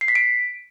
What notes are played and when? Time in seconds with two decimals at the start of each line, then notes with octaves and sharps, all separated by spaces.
0.01 C7
0.08 B6
0.15 D7